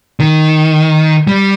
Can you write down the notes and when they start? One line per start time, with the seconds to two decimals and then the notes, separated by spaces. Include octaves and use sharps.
0.20 D#3
1.27 G3